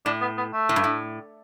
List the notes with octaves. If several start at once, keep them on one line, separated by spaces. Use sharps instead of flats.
A2 D4
B3
B3
A3
A2
G2
A2